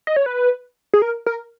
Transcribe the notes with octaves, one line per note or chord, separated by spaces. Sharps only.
D#5
C#5
B4
G#4
A#4
A#4